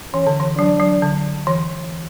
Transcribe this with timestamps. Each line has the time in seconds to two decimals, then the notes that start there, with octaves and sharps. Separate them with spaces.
0.13 E3 C#4
0.27 D3
0.40 E3
0.58 F#3 D4
0.80 F#3
1.02 D3
1.47 E3